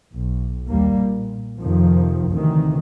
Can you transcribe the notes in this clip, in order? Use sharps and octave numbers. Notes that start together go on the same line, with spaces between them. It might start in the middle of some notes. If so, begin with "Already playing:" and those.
B1
D#2 G3 A#3
A#2
F2 C3 D#3 F3
D2 C3 D#3 E3